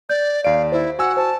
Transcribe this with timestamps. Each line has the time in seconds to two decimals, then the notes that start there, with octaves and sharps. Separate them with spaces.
0.09 D5 G6
0.44 D#2 D5 F5 D7
0.72 E4 C5
0.99 F#4 F#5 G#5 E6
1.17 C5 A5